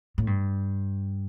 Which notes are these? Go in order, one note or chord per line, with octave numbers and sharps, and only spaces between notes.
A2
G2